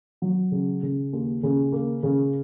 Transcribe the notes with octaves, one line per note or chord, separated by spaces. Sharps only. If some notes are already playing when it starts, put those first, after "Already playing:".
F#3
C#3
C#3
D#2
C#3
A#3
C#3